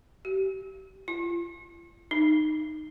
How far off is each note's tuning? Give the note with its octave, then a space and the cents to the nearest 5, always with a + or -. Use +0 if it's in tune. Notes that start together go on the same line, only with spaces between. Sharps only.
G4 -30
F4 -35
D#4 -15